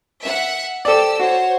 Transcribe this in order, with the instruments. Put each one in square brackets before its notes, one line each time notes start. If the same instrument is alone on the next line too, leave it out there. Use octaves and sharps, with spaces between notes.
[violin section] E5 F#5
[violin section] G4 C5 E6 [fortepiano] A4 D5
[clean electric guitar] F#4 [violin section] C5 C#5